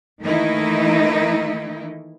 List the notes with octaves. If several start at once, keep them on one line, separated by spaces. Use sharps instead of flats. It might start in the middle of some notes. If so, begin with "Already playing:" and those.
D#3 E3 A3 A#3 D#4 E4